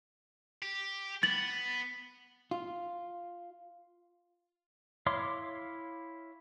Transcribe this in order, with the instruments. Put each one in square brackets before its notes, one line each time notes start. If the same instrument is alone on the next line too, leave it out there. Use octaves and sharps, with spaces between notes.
[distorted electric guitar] G4
[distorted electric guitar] B3 [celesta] A6 F#7
[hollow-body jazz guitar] F4
[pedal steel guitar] E4 C#5 F5 C6 D6